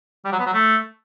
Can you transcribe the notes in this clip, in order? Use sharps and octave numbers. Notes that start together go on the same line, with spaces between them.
G3
F#3
B3
F#3
A3